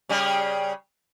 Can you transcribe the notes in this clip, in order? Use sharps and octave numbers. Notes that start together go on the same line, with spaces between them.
C#3 G3 G#4